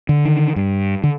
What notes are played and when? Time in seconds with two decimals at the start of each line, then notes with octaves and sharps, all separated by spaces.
0.09 D3
0.25 D#3
0.56 G2
1.04 D3